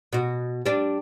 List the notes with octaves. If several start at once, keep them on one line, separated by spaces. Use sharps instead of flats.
B2 F#4
G3 D4